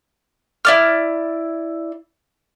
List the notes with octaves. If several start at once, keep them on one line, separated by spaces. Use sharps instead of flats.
E4 D5 F6